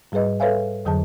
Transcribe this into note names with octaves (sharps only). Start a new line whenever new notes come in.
G#2 G3 G#4 B4 D#5
A4 B4 C#5 E5 F5 G#5
F2 D3 F#3 G#4 A5